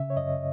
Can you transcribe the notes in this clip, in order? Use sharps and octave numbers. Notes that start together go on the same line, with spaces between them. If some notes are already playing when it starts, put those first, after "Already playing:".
Already playing: C#3 E5
C#5
F#2 D#5